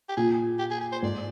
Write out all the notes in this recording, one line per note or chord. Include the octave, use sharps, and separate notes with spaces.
G4
A#2 G#4
G4
G#4
G#4
C5
G#2 D5